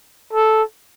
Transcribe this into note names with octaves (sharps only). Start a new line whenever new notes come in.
A4